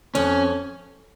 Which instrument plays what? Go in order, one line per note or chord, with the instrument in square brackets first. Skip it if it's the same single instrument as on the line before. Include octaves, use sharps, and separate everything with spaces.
[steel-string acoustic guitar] F2 [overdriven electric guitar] C#4